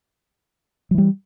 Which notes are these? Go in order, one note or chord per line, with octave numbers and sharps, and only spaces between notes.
E3 F#3 G3